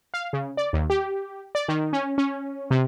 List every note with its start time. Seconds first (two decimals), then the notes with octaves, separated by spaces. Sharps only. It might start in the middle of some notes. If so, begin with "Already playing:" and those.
0.14 F5
0.33 C#3
0.57 D5
0.73 D#2
0.90 G4
1.55 D5
1.68 D#3
1.93 C#4
2.18 C#4
2.71 C3